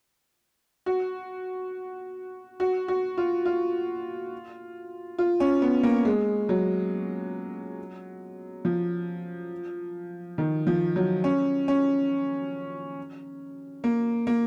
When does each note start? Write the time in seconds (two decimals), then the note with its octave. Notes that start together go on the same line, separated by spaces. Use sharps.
0.86 F#4
2.60 F#4
2.88 F#4
3.18 F4
3.46 F4
5.19 F4
5.40 C#4
5.62 B3
5.83 A#3
6.05 G#3
6.49 F#3
8.65 F3
10.38 D#3
10.67 F3
10.96 F#3
11.24 C#4
11.68 C#4
13.84 A#3
14.27 A#3